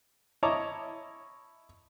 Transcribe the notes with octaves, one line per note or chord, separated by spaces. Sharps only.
E4 C#5 D#5 A5 A#5 D6